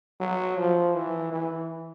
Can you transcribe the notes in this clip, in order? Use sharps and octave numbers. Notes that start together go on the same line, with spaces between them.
F#3
F3
E3
E3